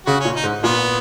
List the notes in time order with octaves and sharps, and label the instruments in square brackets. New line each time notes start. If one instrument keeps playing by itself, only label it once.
[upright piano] C#3 [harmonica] F#4
[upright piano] A#2 [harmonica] C#4
[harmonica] D#4
[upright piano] G#2
[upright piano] A#2 [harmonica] B3